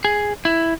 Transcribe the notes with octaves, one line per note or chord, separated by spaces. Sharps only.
G#4
E4